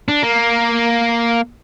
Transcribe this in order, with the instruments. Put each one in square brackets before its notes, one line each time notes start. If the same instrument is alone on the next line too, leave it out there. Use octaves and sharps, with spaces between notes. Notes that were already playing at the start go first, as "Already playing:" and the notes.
[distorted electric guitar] D4
A#3